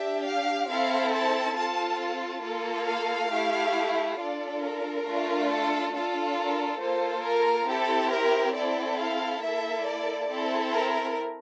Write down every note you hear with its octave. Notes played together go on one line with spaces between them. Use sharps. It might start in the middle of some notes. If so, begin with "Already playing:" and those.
Already playing: D4 G4 E5
F5
C4 E4 A4 F5
A5
C4 F4 A4 A5
A5
A#3 F4 A4
F5
A3 E4 G4
D4 F4 A4 D5
A#4
A3 D4 F4
A4
D4 F4 A4
A#4
A#3 F4 A4 C5
A#4
C4 E4 G4 A4
A#4
C4 E4 A4 D5
F5
A#3 E4 A4 E5
D5
C4 E4 A4
A#4